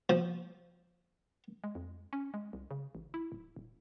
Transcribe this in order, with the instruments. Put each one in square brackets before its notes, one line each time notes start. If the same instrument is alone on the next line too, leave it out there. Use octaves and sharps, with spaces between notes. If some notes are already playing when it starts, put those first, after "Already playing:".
[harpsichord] F3
[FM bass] G#3
F2
C#4
G#3
C2
C#3
A1
E4
D1
D#1